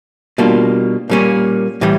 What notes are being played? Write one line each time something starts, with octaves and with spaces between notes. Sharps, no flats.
B2 G3 A#3 D4 F4
A#2 G3 A#3 C#4
A2 E3 G3